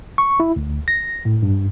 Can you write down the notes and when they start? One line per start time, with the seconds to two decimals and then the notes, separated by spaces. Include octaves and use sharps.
0.18 C#6
0.40 E4
0.56 D2
0.88 A#6
1.25 A2
1.43 G2